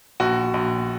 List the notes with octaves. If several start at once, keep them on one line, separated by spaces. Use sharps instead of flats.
A#1 F#4
A#1